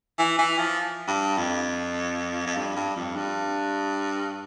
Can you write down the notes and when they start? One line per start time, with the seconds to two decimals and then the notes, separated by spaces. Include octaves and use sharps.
0.19 E3
0.39 E3
0.58 F3
1.08 G2
1.38 F2
2.47 F2
2.57 G2
2.76 G2
2.96 F2
3.16 G2